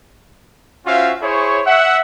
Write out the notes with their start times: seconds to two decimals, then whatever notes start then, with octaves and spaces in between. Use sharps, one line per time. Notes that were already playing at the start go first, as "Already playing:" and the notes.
0.86 C#4 F4 F#4 C5 E5 F5
1.22 E4 G#4 C5 C#5
1.66 E5 F#5